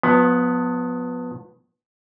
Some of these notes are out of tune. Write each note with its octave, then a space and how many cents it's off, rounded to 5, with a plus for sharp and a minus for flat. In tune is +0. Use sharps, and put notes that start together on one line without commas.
F3 +40 B3 +0